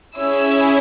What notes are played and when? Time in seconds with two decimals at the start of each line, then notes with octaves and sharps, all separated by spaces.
0.17 C#4 E4 G#4 E6